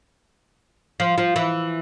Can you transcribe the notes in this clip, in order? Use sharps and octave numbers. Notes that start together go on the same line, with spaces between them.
F3
F3
E3